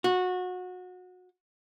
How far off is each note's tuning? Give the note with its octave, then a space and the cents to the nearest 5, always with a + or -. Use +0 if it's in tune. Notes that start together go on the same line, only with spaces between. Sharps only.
F#4 -25